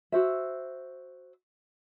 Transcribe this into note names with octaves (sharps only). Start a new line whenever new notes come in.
F#4 C5 E5